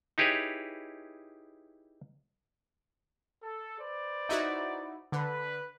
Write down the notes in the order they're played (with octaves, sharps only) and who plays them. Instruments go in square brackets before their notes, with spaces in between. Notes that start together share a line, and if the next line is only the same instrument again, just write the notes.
[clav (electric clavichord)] D#4 E4 G4 G#4 B4 C#5
[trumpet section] A4
B4 C5 D5
[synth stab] D#4 E4 F#4
[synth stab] D3 [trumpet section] B4